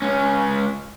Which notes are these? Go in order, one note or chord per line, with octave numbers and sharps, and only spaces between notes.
C#2 C#4